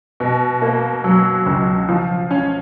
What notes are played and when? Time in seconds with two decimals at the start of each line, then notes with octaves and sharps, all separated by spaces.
0.20 B2
0.62 A#3
1.04 F#3
1.46 C#2
1.89 F3
2.31 C#4